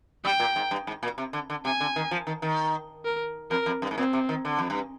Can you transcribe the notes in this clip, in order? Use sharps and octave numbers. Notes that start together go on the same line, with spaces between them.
G3 G5
A#2
G#2
G2
G#2
A#2
C3
D3
D3
C3 G#5
D3
D#3
F3
D#3
D#3
A#4
F2 A#4
F2
G2
G#2
A#2 C4
C3
D#3
D3
F2
G2